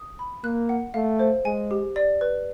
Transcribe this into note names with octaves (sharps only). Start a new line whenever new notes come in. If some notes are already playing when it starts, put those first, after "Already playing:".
Already playing: D#6
B5
A#3 F#6
F#5
A3 F5
C5
G#3 G#5
G4
D5
B4